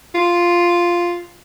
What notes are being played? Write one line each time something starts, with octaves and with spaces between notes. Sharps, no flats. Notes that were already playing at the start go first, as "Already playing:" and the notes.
F4